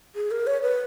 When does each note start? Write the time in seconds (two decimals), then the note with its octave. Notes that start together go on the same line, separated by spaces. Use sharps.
0.15 G#4
0.31 A#4
0.47 C#5
0.62 B4